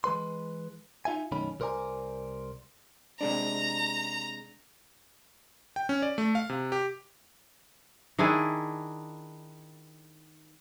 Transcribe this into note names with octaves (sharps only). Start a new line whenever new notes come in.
E3 G#3 B4 C6
D#4 F4 E5 G#5
B1 F#2 D#3 A3 C#4 B5
C2 A#4 C5 D5 G#5 A#5
C3 G#3 D4 A#5
G5
C#4
D5
A3
F5
C3
G4
D#3 D4 E4 G#4